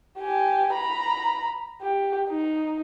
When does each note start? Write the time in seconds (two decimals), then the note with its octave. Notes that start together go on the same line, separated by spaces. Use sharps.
0.18 G4 G#5
0.73 A#5 B5
1.82 G4
2.29 D#4